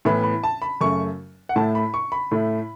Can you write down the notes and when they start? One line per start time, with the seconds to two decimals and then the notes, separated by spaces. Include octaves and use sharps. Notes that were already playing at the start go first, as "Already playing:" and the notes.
0.05 A2 E3 B3 E4 B5
0.24 B5
0.44 A5
0.62 B5
0.81 F#2 C#3 A3 C#6
1.49 F#5
1.56 A2 A3 E4 A5
1.75 B5
1.94 C#6
2.12 B5
2.31 A2 A3 E4